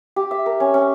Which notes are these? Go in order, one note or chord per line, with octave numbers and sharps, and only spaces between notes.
G4
E5
A#4
C#4
C#4